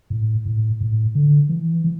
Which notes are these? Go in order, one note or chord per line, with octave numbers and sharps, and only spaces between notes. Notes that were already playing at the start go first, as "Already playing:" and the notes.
A2
A2
A2
D3
E3
E3